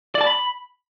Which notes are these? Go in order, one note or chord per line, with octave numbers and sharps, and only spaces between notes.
D5
A5
B5